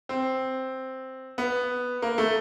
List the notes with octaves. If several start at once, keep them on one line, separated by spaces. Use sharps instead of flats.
C4
B3
A#3
A3